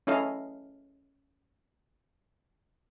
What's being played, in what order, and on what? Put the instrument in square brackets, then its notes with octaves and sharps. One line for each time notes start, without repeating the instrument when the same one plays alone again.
[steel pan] C#4 E4 A4 D#5 F5